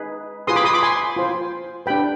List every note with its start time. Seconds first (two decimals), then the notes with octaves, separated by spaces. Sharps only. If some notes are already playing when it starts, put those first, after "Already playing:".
Already playing: D#4 G#4 B4
0.47 F4 G#4 B4 C6 D#6
0.56 B5 D6
0.64 C6 D#6
0.74 B5 D6
0.83 G#5 C6
1.16 F4 C5
1.86 D4 G4 B4 G5 B5